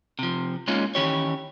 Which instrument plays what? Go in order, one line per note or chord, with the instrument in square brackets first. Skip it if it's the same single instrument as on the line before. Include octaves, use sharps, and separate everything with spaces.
[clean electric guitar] C3 F3
G#3 A#3 C#4 D#4 F4
D#3 E3 C#4 G4 C#5